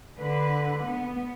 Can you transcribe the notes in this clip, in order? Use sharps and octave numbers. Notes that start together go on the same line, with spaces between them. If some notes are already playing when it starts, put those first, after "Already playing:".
D3 B4
B3